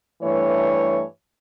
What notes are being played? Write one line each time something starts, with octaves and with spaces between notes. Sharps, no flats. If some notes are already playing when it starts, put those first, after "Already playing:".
G2 E3 A3 C#5